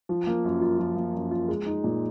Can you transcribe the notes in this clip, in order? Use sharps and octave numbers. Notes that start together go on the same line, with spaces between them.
F3
A#3
F#2
F4
F3
A#3
F#2
F4
G#3
D#4
A#2